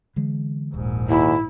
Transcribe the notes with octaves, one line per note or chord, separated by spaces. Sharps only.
D3 E3 G#3
D#1 A#1 G#2
D#2 E4